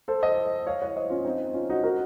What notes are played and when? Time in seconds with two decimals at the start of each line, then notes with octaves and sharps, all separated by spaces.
0.08 A4 C5
0.23 C5 D#5
0.67 C#5 F5
0.82 C#5 F5
0.96 C5 D#5
1.10 C#4 F4
1.25 C4 D#4
1.54 C#4 F4
1.70 D#4 F#4
1.83 F#4 A#4